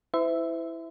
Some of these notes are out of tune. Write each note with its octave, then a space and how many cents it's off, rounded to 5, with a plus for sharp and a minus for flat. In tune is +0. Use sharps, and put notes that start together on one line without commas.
E4 +0 C5 -45 E5 +0